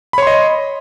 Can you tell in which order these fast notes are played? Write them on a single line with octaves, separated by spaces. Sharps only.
B5 C#5 C6 D#5